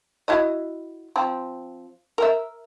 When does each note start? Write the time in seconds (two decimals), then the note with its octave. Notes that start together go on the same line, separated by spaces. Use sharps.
0.28 E4 F#4 D#5
1.16 F3 C4
2.18 A#4 E5